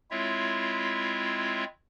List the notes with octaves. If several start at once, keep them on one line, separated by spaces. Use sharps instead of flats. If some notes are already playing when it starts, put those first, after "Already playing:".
G#3 C4 E4 F4 C#5 E5